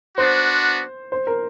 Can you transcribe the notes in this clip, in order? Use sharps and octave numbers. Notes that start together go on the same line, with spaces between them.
B3 D4 F#4 C5
C5
A#4